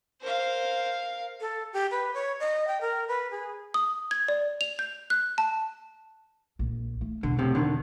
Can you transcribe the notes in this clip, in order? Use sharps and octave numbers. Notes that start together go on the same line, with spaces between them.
A#4 C5 F5
A4
G4
B4
C#5
D#5
G5
A#4
B4
G#4
D#6
G#6
D5
F7
G6
F#6
A5
A#1
A3
E1 D3
A2 C3
D3 D#3